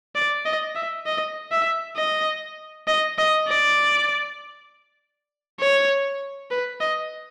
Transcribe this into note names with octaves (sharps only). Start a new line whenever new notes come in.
D5
D#5
E5
D#5
E5
D#5
D#5
D#5
D5
C#5
B4
D#5